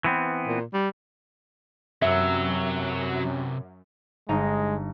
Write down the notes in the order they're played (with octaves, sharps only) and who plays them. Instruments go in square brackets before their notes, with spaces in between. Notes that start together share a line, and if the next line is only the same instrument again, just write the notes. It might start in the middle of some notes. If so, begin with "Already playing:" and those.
[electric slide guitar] E3 B3 C4
[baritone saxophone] A#2
G3
[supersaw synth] F#2 [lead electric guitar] C3 B4 [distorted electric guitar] F#3 [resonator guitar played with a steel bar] E5
[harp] G1 D#4 A#5 [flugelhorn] G#3